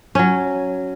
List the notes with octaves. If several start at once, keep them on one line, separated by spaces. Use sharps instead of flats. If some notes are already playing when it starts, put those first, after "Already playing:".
F#3 C#4